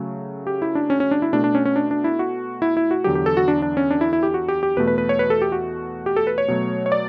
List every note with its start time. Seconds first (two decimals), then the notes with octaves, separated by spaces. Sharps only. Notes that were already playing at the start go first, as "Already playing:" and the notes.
Already playing: C#3 F#3 A3
0.47 G4
0.62 E4
0.75 D4
0.90 C#4
1.00 C#4
1.11 D4
1.22 E4
1.33 B2 A3 D4
1.44 D4
1.55 C#4
1.65 C#4
1.76 D4
1.91 D4
2.04 E4
2.19 F#4
2.62 E4
2.77 E4
2.91 F#4
3.04 E2 D3 F#3 G4
3.15 G4
3.26 A4
3.37 F#4
3.48 D4
3.62 D4
3.77 C#4
3.91 D4
4.01 E4
4.13 E4
4.23 G4
4.34 F#4
4.48 G4
4.63 G4
4.77 E2 B2 A3 B4
4.87 B4
4.98 B4
5.09 C#5
5.19 B4
5.30 A4
5.42 G4
5.52 F#4
6.06 G4
6.16 A4
6.27 B4
6.38 C#5
6.48 B2 F#3 A3
6.86 C#5
6.92 D5